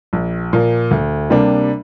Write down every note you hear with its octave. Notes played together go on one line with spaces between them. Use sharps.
A#1
A#2 F3 A#3
D2
C3 G3 A#3 D4